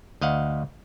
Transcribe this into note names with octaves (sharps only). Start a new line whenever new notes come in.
D2 D#5 F5 F#5